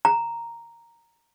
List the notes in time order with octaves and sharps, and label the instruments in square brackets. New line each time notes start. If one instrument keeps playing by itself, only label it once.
[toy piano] A#5